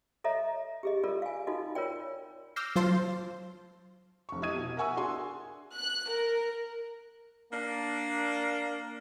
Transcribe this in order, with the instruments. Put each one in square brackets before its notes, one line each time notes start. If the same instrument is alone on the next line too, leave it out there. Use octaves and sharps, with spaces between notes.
[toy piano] A4 C#5 D#5 E5 A#5
G4 G#4 D#5
F4 A4 A#4 D5
F5 G#5
D#4 F4 F#4 A4 D#5
F4 A#4 C#5 D5 G5
[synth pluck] D6 E6 F6 G6 A#6 C7
F#3 F4 C5 A5 C6
[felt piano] F1 C#6
E4 G4 D#5 D#6 G#6 D#7
B2 F#4
A#4 E5 F#5 G#5 C#6 E6
D4 F#4 G#4 G#5 C6
[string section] F#6
A#4
[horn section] A#3 D4